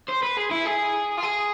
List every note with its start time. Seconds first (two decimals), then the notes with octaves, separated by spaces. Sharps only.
0.09 C5
0.23 B4
0.37 G#4
0.51 E4
0.66 G#4
1.18 F4
1.23 G#4